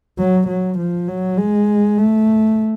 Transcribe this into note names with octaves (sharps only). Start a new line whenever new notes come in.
F#3
F#3
F3
F#3
G#3
A3